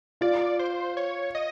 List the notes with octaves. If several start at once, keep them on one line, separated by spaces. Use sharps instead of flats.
F4 D5 F5
C5
C#5
D#5